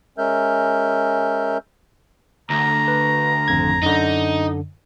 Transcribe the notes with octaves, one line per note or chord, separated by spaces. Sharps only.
G#3 C#4 A#4 E5 F6 G6
D2 A#5
B4
G#1 F2 G#6
F#2 D3 D#4